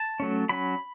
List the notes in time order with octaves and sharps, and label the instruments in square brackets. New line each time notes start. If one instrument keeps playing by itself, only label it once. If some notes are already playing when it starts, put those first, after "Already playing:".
Already playing: [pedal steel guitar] A5
F#3 A3 C#4
F#3 C#4 B5